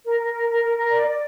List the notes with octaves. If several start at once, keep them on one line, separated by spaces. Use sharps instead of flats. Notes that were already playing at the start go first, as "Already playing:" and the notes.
A#4
A#4
A#4
A#4
A#4
A#4
D5
D5